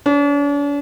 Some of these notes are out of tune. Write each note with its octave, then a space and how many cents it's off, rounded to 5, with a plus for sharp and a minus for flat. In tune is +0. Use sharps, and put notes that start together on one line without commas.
D4 -45 C5 +25